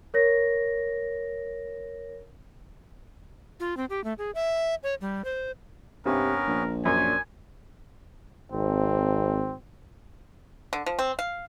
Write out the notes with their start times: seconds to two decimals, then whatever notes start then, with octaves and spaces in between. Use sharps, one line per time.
0.14 A#4 C#5 A#6
3.60 F4
3.77 C4
3.90 G4
4.04 A3
4.18 G#4
4.35 E5
4.83 C#5
5.01 G3
5.25 C5
6.06 G2 C3 B3 C#4 A#4 B4
6.48 A#1
6.85 F#2 C#4 D4 C5 G#5
8.52 G#1 C4
10.73 D3
10.86 F3
10.99 C4
11.19 F5